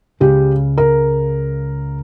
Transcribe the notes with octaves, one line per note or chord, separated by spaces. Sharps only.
C#2 C#3 G#3 G4
A#4